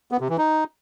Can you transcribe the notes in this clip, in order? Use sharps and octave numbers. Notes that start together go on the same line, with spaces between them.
B3
C3
E3
D#4